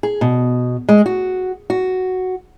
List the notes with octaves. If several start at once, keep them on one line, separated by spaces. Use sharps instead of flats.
G#4
B2
G#3
F#4
F#4